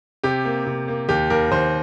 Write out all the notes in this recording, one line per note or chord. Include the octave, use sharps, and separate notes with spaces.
C3 G4
A#3
C3
A#3
D#2 G4
D#2 A#4
D#2 C5